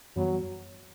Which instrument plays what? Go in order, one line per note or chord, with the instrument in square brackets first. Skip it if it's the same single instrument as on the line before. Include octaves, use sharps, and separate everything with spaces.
[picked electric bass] F#2 E3 G3 B3 [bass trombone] F#3